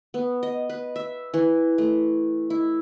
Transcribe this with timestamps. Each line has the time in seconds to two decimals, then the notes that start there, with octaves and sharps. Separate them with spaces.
0.14 B3
0.43 D#5
0.69 B4
0.96 E5
1.34 E3
1.78 A3
2.50 E4